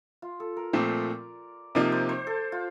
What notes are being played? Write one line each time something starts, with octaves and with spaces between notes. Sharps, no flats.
F4
A4
A#4
A#2 F3 A3 C4 D5
C3 F3 A#3 D#4 D5
C5
C5
A4
F4